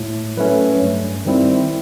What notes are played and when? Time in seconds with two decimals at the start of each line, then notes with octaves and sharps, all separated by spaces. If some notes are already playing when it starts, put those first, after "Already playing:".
Already playing: A2
0.37 F#3 A3 C#4 B4
0.81 G2
1.25 D#3 G3 C4 E4